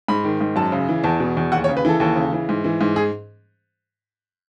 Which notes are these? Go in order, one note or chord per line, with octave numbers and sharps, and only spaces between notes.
G#2 B5
D#3
G#2
F#2 A5
C#3
E3
E2 A5
B2
E2
D#2 F#5
C#5
C#3
B4
E3 A4
D#2 A4
C#3
E3
G#2
E3
G#2
G#4